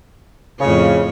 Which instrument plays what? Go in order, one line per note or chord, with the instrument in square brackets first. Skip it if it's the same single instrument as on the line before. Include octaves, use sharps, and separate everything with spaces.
[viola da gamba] F2 A2 C#5 [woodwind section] C#3